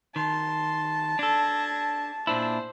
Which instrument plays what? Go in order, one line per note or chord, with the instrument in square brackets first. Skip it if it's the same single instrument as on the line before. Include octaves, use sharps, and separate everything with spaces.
[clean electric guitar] D#3 [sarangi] A5 [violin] C6
[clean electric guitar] D4 A4 [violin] G#6 A#6
[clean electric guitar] A#2 D4 E4 [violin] C5